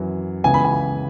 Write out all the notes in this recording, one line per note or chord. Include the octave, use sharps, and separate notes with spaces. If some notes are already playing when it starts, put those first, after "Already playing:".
Already playing: F#2 E3
C#2 C#3 E3 G#5
B5
G#5